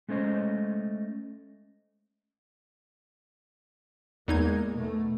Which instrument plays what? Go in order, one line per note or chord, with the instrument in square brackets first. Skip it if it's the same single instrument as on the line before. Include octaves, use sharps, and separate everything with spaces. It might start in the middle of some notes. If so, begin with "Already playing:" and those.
[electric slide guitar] G#3 A3 C#4 C5 D#5
[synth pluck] E2 D#4 G#6 [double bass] G#3 A#3
[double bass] B2 A3